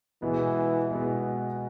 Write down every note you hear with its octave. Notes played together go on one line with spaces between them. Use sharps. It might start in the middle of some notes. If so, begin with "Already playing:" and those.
B2 E3 G#3 B3
B2 G#3 B3